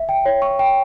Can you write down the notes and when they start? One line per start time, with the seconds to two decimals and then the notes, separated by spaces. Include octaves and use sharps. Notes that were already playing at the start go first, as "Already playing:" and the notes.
Already playing: E5
0.09 G5
0.26 C#5
0.42 C#6
0.59 G5